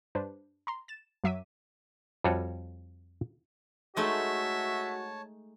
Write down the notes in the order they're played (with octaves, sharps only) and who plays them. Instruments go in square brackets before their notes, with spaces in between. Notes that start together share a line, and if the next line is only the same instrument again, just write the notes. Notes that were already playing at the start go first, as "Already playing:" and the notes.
[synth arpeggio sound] G2 D4 B4 C5
A#5 C6
A6 E7
F#2 F#3 E5 D6 B6 D#7
[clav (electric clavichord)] F2 G3 F4 F#4 A4 C#5
[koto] G#3 A3 D#4 [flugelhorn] F#4 [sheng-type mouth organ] C#5 A5 [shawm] E5